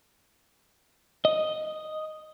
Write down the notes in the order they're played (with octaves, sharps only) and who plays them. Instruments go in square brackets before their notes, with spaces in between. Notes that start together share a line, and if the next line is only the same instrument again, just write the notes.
[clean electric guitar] D#5